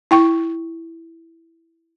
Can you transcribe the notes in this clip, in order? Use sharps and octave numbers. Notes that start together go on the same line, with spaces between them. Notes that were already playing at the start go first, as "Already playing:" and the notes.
E4 G5 C#6